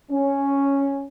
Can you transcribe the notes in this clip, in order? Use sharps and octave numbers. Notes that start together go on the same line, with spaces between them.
C#4